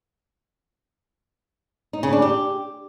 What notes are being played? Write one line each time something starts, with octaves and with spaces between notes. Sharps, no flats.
D#4
C#3
D4
G4